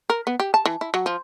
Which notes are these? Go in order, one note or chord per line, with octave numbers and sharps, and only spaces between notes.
A#4
B3
G4
A5
E3
E4
F#3
F3